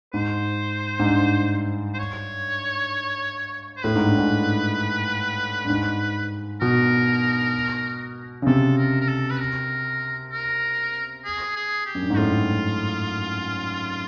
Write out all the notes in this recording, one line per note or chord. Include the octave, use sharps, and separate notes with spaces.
G#2 C5
G#2
G2
C5
C#5
C5
A2 B4
G#2
G2
G#2
G2
G#2
B2 A#4
C#3
C3 A4
A#4
A#4
A4
B4
A#4
A#4
G#4
G#4
G4
F#2
G2
G#2
A2 F4